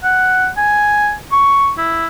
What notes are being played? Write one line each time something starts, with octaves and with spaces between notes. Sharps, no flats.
F#5
G#5
C#6
E4